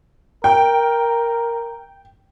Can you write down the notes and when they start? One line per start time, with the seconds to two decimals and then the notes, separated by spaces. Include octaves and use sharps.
0.44 A#4 G5